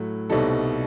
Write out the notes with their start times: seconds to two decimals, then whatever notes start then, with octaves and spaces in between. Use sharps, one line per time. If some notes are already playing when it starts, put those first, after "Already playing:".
Already playing: A2 F#3 A3
0.30 C2 B2 G3 D#4 A4